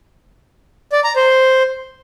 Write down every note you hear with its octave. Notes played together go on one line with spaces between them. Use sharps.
D5
A#5
C5